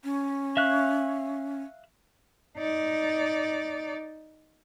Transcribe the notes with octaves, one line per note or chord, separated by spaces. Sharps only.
C#4
E5 F5 F#6
D#4 D5